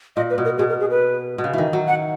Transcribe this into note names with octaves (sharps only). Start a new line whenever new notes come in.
A#2 D#5
B4
B2
A#4
B2 G#4
A#4
G#4
B4
B2
C#3
D#3 E3
F#3
F#5